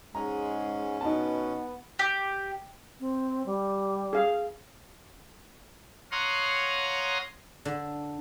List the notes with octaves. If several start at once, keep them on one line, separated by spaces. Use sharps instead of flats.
G#2 G#3 C#4 A#5
B2 B3 D#4 A5
G4
C4
G3
G#4 F5
C#5 F5 F#5 A#5 C6 D#6
D3